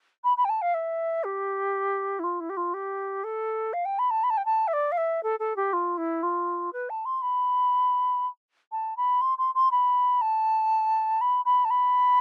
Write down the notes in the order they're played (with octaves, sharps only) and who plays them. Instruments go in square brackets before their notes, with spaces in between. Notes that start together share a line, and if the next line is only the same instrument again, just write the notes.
[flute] B5
B5
G5
A5
F5
E5
G4
E4
F4
E4
G4
F4
G4
A4
F5
G5
B5
A5
B5
A5
G5
A5
E5
D5
F5
E5
A4
A4
G4
F4
E4
F4
B4
A5
C6
B5
A5
B5
C6
C6
C6
B5
A5
B5
B5
A5
B5